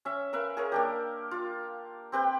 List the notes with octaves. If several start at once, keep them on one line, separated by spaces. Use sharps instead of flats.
C#4 E5
A#4 B4 E5 F5
G#4 A#4 C#5
A#3 D4 G4
F4
C4 G4 B4 G5